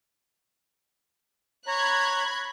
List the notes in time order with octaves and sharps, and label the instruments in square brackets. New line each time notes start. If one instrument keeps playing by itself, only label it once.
[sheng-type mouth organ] C#5 A#5 [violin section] B5 F#6 G#6